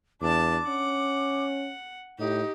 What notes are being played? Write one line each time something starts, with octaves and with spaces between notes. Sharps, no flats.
E2 D4 A5 D6
C#4 F#5
A2 D#4 G4